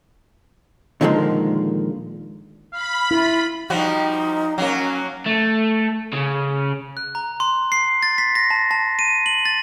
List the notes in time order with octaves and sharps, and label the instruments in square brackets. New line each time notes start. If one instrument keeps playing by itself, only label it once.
[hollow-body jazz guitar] A#2 D3 D#3 F3 G#3 A#3
[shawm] F5 [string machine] B5
[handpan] E4 [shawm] F4
[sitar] F3 G3 F#4 [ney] D#4
[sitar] F#3 A#3 [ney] C#4
[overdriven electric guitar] A3
C#3
[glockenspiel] F#6
A#5
C6
C7
A6
B6
A#6
A5
A5
D#7
F#7
A6